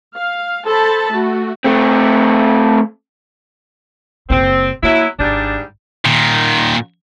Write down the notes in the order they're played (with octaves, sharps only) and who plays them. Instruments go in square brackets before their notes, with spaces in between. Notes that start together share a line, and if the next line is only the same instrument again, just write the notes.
[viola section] F5
A4 C5 A5 B5
A3 F#4
[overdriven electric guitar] A3 C4
[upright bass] F#1 C#3 [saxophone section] C4
[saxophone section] F#3 E4 [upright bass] A#3
[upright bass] G#1 [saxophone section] G#2 G3 D4
[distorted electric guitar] A#2 D#3